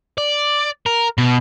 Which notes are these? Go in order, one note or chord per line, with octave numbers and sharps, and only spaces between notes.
D5
A#4
B2